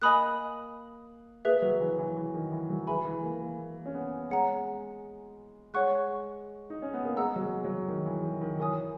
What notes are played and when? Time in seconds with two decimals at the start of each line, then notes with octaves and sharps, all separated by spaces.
0.02 A#3 D#5 G#5 B5 D#6 F#6
1.45 A#3 G#4 B4 E5
1.62 F#3
1.80 E3
1.99 E3
2.16 E3
2.34 D#3
2.52 E3
2.70 F#3
2.87 G#3 B4 E5 G#5 B5
3.05 E3
3.23 A#3
3.42 A#3
3.86 C#4
3.95 B3
4.30 G#3 C#5 F#5 A#5
5.74 G#3 C#5 F#5 C#6 F#6
6.70 D#4
6.82 C#4
6.94 B3
7.05 A#3
7.17 G#3 D#5 F#5 A#5 E6
7.36 F#3
7.40 G#3
7.64 F#3
7.88 D#3
8.05 E3
8.23 D#3
8.41 D#3
8.60 E3 A#4 C#5 G#5 D#6